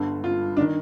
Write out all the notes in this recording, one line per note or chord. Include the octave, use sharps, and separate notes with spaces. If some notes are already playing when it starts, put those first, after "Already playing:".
Already playing: G1 G2 D3
F4
D4
D#3